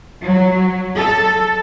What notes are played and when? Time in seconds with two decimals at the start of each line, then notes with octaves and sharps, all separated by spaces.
0.24 F#3
0.95 A4